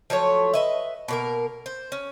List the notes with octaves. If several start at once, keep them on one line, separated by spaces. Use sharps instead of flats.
F3 F#3 A3 C#5
B4 D#5 E5
B2 A#3 A#4
C5
C#4